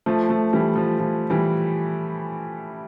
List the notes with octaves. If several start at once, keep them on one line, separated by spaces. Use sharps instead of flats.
F3 A3
F3 A3
E3 G3
F3
F3
E3 G3